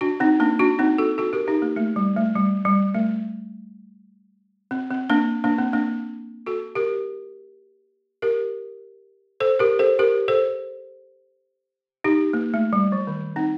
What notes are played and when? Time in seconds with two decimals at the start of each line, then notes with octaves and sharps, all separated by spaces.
0.01 D4 F#4
0.20 C4 D#4
0.40 A#3 D4
0.59 D4 F#4
0.79 C4 D#4
0.98 F#4 A4
1.18 F#4 A4
1.33 G4 A#4
1.47 D#4 G4
1.62 A#3
1.76 A3
1.96 G3
2.16 A3
2.36 G3
2.65 G3
2.95 A3
4.71 C4
4.91 C4
5.10 A#3 D4
5.44 A#3 D4
5.58 C4
5.73 A#3 D4
6.46 F#4 A4
6.75 G4 A#4
8.22 G4 A#4
9.40 A4 C5
9.59 G4 A#4
9.79 A4 C5
9.99 G4 A#4
10.28 A4 C5
12.04 D#4 G4
12.33 A#3
12.54 A3
12.73 G3
12.92 F#3
13.07 D#3
13.36 C4 D#4